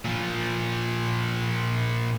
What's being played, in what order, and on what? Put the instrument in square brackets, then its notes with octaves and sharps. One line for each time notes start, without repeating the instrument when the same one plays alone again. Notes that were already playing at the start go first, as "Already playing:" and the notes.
[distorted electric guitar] A#2 F3